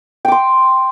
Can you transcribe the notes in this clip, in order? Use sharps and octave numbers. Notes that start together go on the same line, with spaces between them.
G5 C6 D6